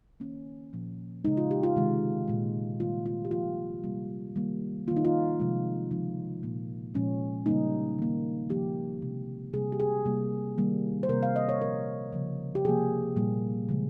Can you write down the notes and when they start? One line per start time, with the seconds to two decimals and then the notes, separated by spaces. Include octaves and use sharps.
0.20 D#3 A#3 C#4
0.73 A#2 F3 A#3
1.24 C#3 G#3 D#4
1.37 F4
1.51 G4
1.63 F4
1.76 C3 D#3 G#3
2.28 A#2 G#3
2.80 D#3 G3 A#3 F4
3.06 F4
3.25 G4
3.31 A#2 F3 A#3 F4
3.83 C3 G3 A#3
4.36 D#3 G3 A#3
4.87 D#3 A#3 F4
4.96 D#4
5.05 F4
5.40 C3 F3 G#3
5.91 C#3 F3 G#3 D#4
6.43 A#2 F3 A#3
6.94 A#2 F3 G#3 C#4
7.46 C#3 G3 A#3 D#4
7.98 D#3 A#3
8.50 C#3 F3 A#3 G4
9.02 C3 F3 G#3
9.53 C3 G3 A#3 G#4
9.72 G4
9.80 G#4
10.05 C3 G3 A#3
10.58 D#3 G3 A#3
11.03 C5
11.09 C3 G3 A#3 A#4
11.23 F5
11.36 D#5
11.49 C#5
11.61 A#2 F3 A#3 A#4
12.13 C#3 F3 A#3
12.55 G4
12.64 C3 F3 A#3 G#4
13.16 A#2 G3 A#3
13.69 C#3 F3 G#3